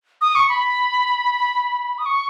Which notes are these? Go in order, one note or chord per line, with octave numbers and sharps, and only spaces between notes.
D#6
C#6
B5
D#6
C#6